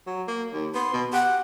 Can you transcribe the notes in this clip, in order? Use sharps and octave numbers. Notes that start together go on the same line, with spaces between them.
F#3
A#3
D#2
B3 C6
B2
G4 F#5